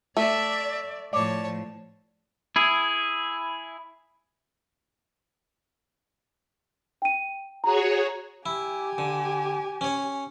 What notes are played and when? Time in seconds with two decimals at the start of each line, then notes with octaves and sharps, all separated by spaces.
0.17 A3 D5 E5
1.13 A2 F3 C#5 D5 A5
2.56 E4 G#4
7.02 G5 D#7
7.64 F#4 G#4 C#5 A#5
8.46 E4 G4 G#5
8.98 D3
9.81 C#4 C#5